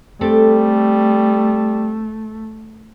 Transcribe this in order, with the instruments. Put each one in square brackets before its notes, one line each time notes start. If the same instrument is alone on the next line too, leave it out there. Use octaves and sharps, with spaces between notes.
[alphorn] G3 [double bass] A3 [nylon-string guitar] C4 G4 A4